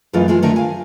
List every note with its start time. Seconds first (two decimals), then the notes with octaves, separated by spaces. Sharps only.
0.13 F#2 E3 G#3 A3 F4
0.28 E3 G#3 F4 G#4
0.42 D3 D#3 A3 A#4
0.56 F5 G#5